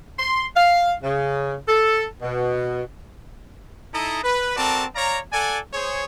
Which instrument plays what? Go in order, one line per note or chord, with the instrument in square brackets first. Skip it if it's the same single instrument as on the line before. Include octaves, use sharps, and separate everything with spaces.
[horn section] C6
F5
C#3
A4
B2
[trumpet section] D#4 E4 A4 D#5 A5 A#5
B4
C4 F#4 A4 A#4 D5 A5
C#5 D5 F5 A#5
A4 D5 F#5 G#5
G#4 C5 C#5